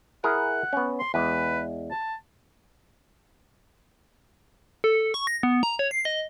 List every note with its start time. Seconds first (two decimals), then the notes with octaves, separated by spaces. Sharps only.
0.24 E4 G#4 A#4 F#5
0.73 B3 C#4
0.99 C6
1.14 E2 G#3 B4
1.91 A5
4.84 A4
5.14 C#6
5.27 A#6
5.43 B3
5.63 A#5
5.79 C#5
5.91 C7
6.05 D#5